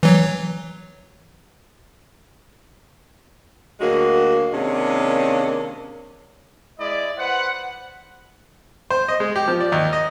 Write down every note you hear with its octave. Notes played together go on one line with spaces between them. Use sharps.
E3 F#3
D2 F#3 G#3 A#3 F#4
C3 D#3 G#3 A#3 C#4 D4
G#3 E4 D5 D#5
B4 C5 F#5
C5
D#5
G#3
G4
F3
D5
D#2
D#5